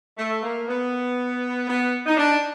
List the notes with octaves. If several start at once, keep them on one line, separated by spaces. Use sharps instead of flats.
A3
A#3
B3
B3
D#4
D4